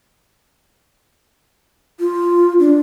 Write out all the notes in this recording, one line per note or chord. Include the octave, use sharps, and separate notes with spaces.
F4
D4